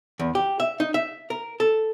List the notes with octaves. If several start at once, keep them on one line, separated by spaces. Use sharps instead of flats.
E2
G4
E5
D#4
E5
A#4
A4